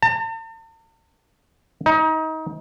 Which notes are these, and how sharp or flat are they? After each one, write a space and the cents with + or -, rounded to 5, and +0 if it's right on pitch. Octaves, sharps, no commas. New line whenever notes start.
A5 +45
D#4 +30